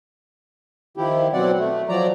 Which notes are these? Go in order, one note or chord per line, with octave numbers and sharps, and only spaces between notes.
D#3 F3 E4 G4
B2 F#3 C4 D5 F#5
A3
F3 F#3 D5 A#5